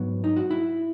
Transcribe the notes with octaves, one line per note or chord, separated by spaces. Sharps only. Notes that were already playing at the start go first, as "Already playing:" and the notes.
Already playing: G#2 F#3 B3
D#4
F#4
E4